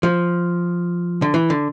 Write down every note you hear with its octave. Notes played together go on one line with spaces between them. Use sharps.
F3
D3
E3
D3